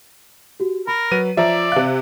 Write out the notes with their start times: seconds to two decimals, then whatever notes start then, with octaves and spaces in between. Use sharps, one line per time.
0.60 F#4 G4
0.87 A#4 B5
1.11 F#3 B4 D#7
1.37 F3 C#5 D5 E5 A#5 D6
1.72 C3 F5 F#6